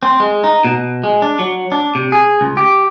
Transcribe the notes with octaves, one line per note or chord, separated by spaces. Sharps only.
C4
G#3
D#4
B2
G#3
D4
F#3
D4
C3
G#4
C#2
G4